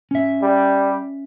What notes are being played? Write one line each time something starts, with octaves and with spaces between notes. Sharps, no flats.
C#4 E5
G3